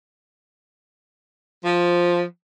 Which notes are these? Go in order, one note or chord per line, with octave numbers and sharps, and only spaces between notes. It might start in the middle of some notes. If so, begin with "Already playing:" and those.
F3